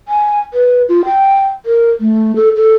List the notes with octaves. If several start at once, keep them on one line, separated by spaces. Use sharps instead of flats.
G#5
B4
F4
G5
A#4
A3
A4
A4